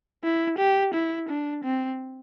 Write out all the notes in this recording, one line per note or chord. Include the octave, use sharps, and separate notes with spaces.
E4
G4
E4
D4
C4